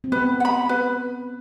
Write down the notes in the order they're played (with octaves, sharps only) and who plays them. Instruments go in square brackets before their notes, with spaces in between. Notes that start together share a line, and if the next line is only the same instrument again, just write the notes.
[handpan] C4
[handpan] B3 [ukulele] B4
[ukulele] F#5
B5
B4